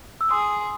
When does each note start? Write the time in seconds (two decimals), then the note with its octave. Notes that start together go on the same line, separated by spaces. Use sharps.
0.21 E6
0.31 G#4 C6 D#6